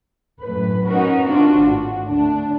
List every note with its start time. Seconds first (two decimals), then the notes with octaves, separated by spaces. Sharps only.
0.42 F#2 A2 B4
0.86 C#4 D#4 F#4 A#4 B4
1.25 C3 C4 D4 F4 F#4
1.57 G#1 A2 F#4
2.06 D2 D4